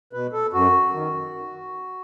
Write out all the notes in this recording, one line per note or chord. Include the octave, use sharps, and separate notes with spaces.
B2 B4
A4
F#2 F#4
D#3